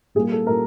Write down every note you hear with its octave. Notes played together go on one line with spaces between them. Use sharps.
A#2 G3 A#3 G#4
A4
A#2 G3 A#3 A#4